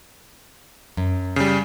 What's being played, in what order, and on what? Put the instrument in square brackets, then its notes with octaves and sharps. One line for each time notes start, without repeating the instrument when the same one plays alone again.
[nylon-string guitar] F#2
[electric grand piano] C#3 G3